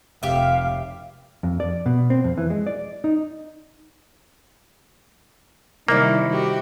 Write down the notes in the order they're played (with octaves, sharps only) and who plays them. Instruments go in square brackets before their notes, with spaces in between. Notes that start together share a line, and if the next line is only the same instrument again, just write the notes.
[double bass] F1 [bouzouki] G4 E5 [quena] F5
[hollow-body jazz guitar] F2
D5
B2
C4
F2
E3
G#3
D5
D#4
[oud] C3 E4 D5 [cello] D#3 G3 [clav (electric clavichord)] A#3
[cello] F#4 G4